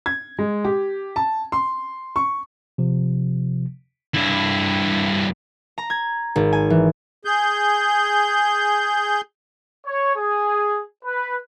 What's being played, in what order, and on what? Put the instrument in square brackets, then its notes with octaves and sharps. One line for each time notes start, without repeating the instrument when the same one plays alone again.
[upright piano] G#6
G#3
G4
A5
C6
C#6
[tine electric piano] C3 F3
[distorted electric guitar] G2 E4
[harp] A#5
G#6
G#1
G#5
E3
[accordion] G#4 G6
[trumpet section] C#5
G#4
B4